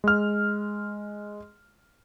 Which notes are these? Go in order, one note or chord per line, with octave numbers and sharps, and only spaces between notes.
G#3 F6